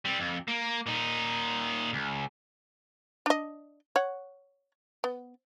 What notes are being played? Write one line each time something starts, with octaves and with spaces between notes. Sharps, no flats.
G3 C4
F2
A#3
A#2 D#4
C#2
D4 D#5
C#5 F#5
B3